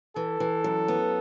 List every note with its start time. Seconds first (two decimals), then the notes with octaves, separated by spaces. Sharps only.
0.16 E3 A4
0.40 E3
0.64 F#2
0.88 B3